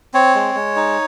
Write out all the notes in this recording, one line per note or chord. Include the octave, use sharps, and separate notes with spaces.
C4 C#5
G#3
G#3
D#4